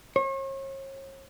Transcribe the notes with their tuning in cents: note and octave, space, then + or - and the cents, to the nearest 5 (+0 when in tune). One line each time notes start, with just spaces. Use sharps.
C#5 -40